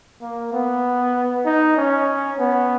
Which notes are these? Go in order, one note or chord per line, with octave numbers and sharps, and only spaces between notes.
A#3
B3
D#4
C#4
B3